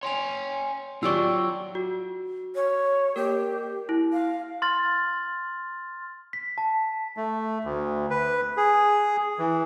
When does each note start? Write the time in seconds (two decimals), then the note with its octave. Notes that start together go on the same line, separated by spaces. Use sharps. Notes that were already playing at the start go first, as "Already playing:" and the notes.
0.03 C#5 G5 G#5 C6 F7
1.03 F#3 F4 G4 D5 C#6 E6
1.75 F#4
2.55 C#5
3.16 A#3 G4 A#4
3.89 E4
4.13 F5
4.62 C6 F6 A6
6.33 B6
6.58 A5
7.17 A3
7.65 D2
8.10 B4
8.57 G#4
9.39 E3